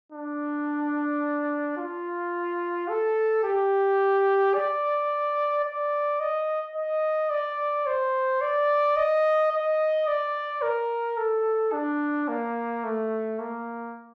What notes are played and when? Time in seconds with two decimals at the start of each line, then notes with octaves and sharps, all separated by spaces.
0.12 D4
1.77 F4
2.88 A4
3.44 G4
4.55 D5
5.65 D5
6.20 D#5
6.75 D#5
7.30 D5
7.86 C5
8.41 D5
8.96 D#5
9.52 D#5
10.07 D5
10.62 A#4
11.17 A4
11.73 D4
12.28 A#3
12.84 A3
13.39 A#3